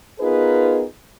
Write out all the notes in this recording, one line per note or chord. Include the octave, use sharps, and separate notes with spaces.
B3 D#4 F4 G#4 A#4 B4